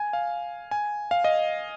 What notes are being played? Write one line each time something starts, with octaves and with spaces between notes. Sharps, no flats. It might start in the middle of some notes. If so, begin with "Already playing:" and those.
Already playing: G#5
F5
G#5
F5
D#5